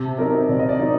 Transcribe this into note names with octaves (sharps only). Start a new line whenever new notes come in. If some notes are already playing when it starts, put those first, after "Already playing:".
Already playing: C3 A5
F#3 C4 D#4 A#4
C3 D5
D#5
D5
F#3 C4 D#4